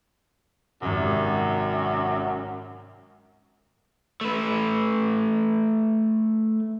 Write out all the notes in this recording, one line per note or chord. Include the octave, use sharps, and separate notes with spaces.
G#1 F#2 C3
A3 B4